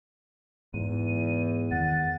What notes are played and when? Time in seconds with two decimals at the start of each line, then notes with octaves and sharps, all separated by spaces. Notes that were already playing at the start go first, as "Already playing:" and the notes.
0.74 E2 G#2 D#7
1.71 E2 D#3 F#5 A6